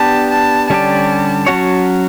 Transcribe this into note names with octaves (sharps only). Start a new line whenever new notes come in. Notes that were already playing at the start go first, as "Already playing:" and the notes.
Already playing: B3 D4 G4 A5
A5
D3 G3 C#4 G4 D5 A5
F#3 C#4 F#4 C#5